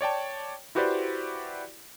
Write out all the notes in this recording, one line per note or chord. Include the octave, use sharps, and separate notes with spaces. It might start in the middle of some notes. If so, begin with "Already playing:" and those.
C#5 D5 G5 A5
E4 F#4 G4 B4 C5 D5